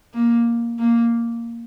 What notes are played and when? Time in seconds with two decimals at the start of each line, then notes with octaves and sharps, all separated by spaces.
0.14 A#3
0.79 A#3